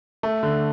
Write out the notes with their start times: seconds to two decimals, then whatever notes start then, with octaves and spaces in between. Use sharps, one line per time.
0.23 A3
0.43 D3